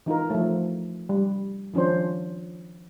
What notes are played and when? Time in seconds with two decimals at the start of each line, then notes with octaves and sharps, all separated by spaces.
0.06 E3 D#4 F4 A#4
0.30 F3 A3
1.09 G3
1.74 D#3 F3 C#4 D4 C5